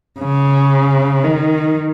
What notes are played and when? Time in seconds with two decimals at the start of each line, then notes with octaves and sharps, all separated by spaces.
0.19 C#3
1.24 D#3